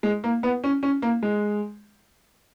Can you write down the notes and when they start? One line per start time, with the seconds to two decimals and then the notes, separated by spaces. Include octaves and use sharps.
0.03 G#3
0.24 A#3
0.43 B3
0.64 C#4
0.83 C#4
1.02 A#3
1.23 G#3